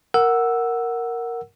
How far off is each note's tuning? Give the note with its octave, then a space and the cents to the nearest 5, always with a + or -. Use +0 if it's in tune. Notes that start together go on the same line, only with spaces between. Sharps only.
A#4 +0 F#5 +0 E6 +0